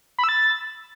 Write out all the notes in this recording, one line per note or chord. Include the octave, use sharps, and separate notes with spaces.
B5
E6
A6